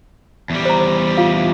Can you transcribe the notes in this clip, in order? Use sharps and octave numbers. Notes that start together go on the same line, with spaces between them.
E2 G3
C5 A#5
C5
F4 F5